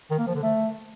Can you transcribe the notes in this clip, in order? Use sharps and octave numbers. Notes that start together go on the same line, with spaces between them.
D#3
A#3
F3
D3
A3